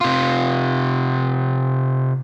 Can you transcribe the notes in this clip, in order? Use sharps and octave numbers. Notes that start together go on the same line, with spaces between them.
C3 F4